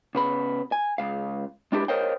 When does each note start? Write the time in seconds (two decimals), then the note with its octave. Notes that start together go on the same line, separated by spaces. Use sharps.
0.15 C#3 B3 B5
0.72 G#5
0.98 C#2 F5
1.72 G#3 D4 E4 G4
1.88 A#4 C5 C#5 D#5 F5 G5